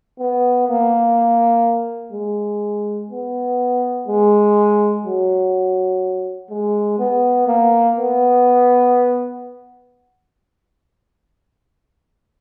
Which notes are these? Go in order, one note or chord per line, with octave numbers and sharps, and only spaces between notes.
B3
A#3
G#3
B3
G#3
F#3
G#3
B3
A#3
B3